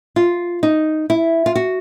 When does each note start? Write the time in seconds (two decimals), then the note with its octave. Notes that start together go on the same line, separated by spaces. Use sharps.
0.16 F4
0.63 D#4
1.10 E4
1.46 F4
1.55 F#4